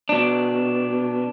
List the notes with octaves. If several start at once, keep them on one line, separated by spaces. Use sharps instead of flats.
B2 D4